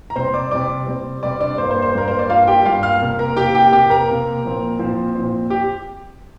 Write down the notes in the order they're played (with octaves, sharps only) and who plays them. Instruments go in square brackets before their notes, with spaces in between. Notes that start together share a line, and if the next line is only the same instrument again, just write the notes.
[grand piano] A#5
C3 G3 C4 C5 C6
D5 D6
C3 G3 C4 D5 D6
C3 G3 C4
C3 G3 C4 D5 D6
D4 D5
G2 G3 A#3 C5
C5
C5
G2 G3 A#3 A#4
C5
D5
G2 G3 A#3 F4 F5
G4 G5
G2 G3 A#3 F4 F5
F5 F6
C3 A#3
A#4 A#5
C3 A#3 G4 G5
G4 G5
C3 A#3 G4 G5
A#4 A#5
C3 A#3
A#2 F3 C4
A#2 F3 C4
A#2 F3 C4
G4